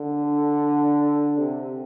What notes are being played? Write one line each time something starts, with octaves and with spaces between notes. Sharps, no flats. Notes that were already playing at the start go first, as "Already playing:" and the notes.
Already playing: D3
C3